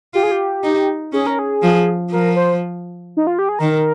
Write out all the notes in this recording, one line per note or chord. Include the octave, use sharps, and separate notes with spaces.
F4 G4
G#4
G4
D#4
C#4 G#4
A#4
G#4
F3
F3 A#4
C5
D#4
F4
G4
G#4
D#3 A#4